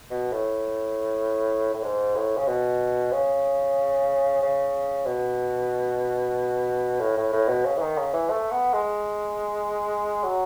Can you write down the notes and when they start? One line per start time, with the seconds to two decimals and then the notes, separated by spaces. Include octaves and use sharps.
0.11 B2
0.33 A2
1.74 A2
1.84 G#2
2.16 A2
2.38 C#3
2.48 B2
3.12 C#3
4.42 C#3
5.06 B2
7.01 A2
7.17 A2
7.33 A2
7.49 B2
7.65 C#3
7.78 E3
7.81 D#3
7.98 C#3
8.14 E3
8.30 A3
8.51 B3
8.73 G#3
10.24 F#3